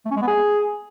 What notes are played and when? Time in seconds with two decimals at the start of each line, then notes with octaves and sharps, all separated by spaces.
0.05 A3
0.11 C#4
0.16 G#3
0.22 B3
0.27 G#4